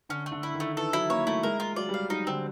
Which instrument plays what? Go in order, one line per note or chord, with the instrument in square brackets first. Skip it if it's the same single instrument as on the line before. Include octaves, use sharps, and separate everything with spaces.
[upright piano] D3 [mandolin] C#4
[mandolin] A3
[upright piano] D3
[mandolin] E4
[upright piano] D#3
[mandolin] A3
[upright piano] E3 [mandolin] A4
[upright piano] F#3 [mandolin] E4
[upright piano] A#3 [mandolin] C#5
[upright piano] A3 [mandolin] E4
[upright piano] G#3 [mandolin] A#4
[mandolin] F4
[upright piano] F#3 [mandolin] D5
[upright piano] G3
[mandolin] F5
[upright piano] F#3 [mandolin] D#4
[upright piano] D3 [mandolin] C4